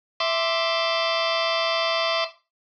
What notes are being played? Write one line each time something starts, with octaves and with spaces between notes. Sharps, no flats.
E5 C6 D6